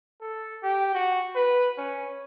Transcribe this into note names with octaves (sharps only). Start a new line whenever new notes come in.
A4
G4
F#4
B4
C#4